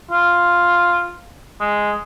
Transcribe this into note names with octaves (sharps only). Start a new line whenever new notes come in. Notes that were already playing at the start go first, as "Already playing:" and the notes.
F4
G#3